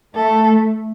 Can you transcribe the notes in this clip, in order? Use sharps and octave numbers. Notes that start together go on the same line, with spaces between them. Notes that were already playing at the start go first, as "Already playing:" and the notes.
A3 A4